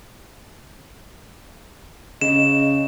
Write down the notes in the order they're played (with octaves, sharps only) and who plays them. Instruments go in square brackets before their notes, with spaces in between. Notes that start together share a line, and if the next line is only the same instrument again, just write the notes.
[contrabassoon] C#3 [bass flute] D#5 [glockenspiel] E7